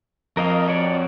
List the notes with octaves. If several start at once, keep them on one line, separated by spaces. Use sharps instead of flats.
F2 A#4 D#5 F5
F#4 C#5 D5